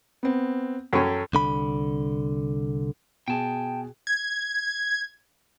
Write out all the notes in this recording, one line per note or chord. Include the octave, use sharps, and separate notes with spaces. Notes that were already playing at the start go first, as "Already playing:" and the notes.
B3 C4
F#2 C#4 A4 G5
C2 D3 B5
B2 G#4 G5 A5
G#6